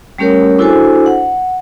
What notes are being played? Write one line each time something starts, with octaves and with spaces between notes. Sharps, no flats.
G3 A3 C#4 G4 A#4 C#5
D4 E4 F#4 A4 C5 G#5
F#5